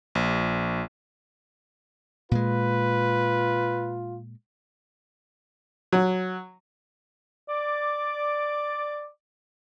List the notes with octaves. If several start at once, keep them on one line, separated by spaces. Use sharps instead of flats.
A#1
A#2 G#3 F4 B4
F#3
D5 D6